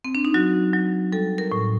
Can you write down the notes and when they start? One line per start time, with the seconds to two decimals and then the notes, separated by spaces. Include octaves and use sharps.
0.05 C4
0.15 D4
0.25 D#4
0.34 F#3 F#4
0.73 F#3
1.12 G3 A4
1.38 A#4
1.52 A2